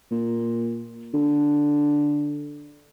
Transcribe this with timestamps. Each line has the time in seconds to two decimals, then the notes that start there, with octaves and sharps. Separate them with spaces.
0.11 A#2
1.14 D3